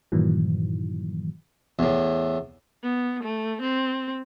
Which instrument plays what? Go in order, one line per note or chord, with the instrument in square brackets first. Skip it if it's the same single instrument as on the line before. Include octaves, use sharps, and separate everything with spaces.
[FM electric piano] G2 A#2 D#3 E3 F#3
[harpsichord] E2 A2
[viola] B3
A3
C4